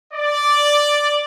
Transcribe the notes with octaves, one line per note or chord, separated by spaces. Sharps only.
D5